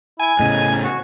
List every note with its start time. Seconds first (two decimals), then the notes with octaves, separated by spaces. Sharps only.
0.19 E4 G#5 G#6
0.39 A2 C#3 D#5
0.83 F#4